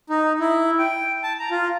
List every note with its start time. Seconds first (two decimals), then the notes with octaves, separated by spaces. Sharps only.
0.10 D#4
0.40 E4
0.79 G5
1.23 A5
1.39 A#5
1.51 F4